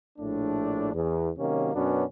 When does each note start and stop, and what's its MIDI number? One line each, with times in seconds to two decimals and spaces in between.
0.19 0.90 34
0.19 0.90 45
0.19 0.90 57
0.19 0.90 62
0.94 1.30 40
1.38 1.73 48
1.38 1.73 51
1.38 1.73 54
1.38 1.73 58
1.38 1.73 61
1.74 2.04 42
1.74 2.04 47
1.74 2.04 59
1.74 2.04 61
1.74 2.04 62